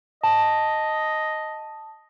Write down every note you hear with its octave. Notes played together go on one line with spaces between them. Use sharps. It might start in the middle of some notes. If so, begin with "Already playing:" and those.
D#5 A5